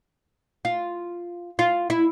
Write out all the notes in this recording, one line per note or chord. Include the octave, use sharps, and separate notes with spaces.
F4
F4
E4